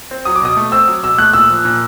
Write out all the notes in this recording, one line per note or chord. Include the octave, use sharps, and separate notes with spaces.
C4
F#3 D#6
D6
B2 D#6
A3
C4 E6
F#3
B2 E6
A3 F#6
A#2 E6
F3
A#2